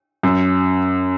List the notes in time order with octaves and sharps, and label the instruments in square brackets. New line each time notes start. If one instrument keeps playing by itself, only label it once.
[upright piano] F#2